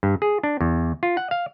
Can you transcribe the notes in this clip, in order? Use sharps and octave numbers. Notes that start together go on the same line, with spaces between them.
G2
G#4
D4
E2
F4
F#5
F5